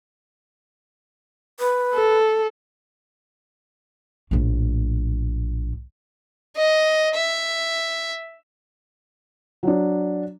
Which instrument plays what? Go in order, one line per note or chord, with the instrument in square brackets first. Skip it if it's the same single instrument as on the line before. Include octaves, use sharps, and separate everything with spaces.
[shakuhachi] B4
[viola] A4
[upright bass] A#1 A2
[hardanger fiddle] D#5
E5
[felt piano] F#3 D4